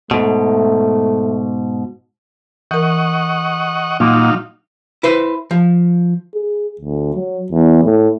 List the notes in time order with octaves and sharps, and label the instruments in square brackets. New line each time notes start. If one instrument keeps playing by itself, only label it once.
[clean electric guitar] G#2 B2 [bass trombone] A3
[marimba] E3 A#4 [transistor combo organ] D#5 F#5 C#6
[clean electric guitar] A#2 [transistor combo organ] F#3 D#4 F5
[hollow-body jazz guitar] E4 B4 C5
F3
[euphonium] G#4
D2
F#3
E2
A2